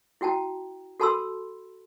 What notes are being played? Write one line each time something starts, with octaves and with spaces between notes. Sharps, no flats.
E4 F#4 G5 A5 A#5
F#4 A4 A5 B5 C6 E6